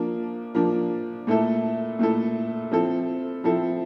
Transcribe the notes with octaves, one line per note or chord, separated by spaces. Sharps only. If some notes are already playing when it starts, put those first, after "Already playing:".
Already playing: F3 A#3 D4
F3 A#3 D4
A#2 A3 E4 A4
A#2 A3 E4 A4
F3 C4 E4 A4
F3 C4 E4 A4